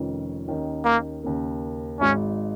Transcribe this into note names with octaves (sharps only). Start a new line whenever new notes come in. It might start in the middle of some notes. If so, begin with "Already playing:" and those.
Already playing: F1 F2 D#3 C#4
D#2 D#3 C#4
A#3
D#2 C#3 A#3
G#1 G#2 G#3 C#4 D#4